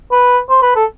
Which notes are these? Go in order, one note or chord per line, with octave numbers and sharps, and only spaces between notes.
B4
C5
B4
A4